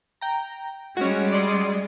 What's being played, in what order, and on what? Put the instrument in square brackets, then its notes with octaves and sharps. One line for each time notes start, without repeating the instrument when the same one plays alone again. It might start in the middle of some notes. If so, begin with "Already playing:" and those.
[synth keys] G5 A#5
[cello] G3 G#3 [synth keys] C#4 F#4
[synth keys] D5 C6 D#6